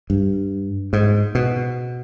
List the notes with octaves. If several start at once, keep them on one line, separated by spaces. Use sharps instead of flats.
G2
G#2
B2